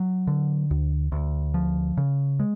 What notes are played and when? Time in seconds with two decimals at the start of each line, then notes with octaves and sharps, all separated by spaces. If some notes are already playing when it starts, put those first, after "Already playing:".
Already playing: F#3
0.27 D3
0.71 D2
1.12 D2
1.54 F3
1.97 C#3
2.40 G#3